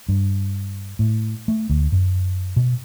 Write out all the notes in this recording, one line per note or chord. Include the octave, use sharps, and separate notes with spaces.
G2
A2
A3
D2
F#2
B2